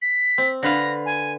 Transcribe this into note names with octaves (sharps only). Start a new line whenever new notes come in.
B6
C4
D3 B4 F5 A#6
G#5